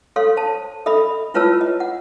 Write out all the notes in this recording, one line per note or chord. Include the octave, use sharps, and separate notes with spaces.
A4 C#5 F5 C6
C5 A5
A4 D#5 E5 B5
E4 F4 B4 C#5 A5 E6
D#5
F#5